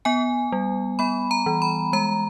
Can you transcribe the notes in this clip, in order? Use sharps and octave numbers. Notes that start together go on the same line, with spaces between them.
B3 G#5
G3
B3 B5
A#5
E3
B5
G#3 A#5